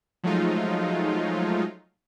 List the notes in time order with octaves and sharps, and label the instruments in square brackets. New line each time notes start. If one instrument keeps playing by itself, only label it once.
[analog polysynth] F3 F#3 G#3 A3 D#4 F4